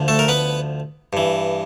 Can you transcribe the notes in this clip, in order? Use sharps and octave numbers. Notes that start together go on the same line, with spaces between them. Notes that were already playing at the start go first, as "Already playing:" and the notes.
Already playing: D2 D3 F3
A3 A4
A#4
B3 B4
G2 E3